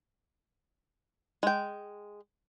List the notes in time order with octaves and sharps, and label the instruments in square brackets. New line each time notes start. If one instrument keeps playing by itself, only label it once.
[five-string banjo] G#3 G5